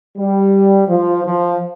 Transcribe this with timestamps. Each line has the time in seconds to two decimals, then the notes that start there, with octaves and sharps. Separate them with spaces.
0.18 G3
0.88 F3
1.25 F3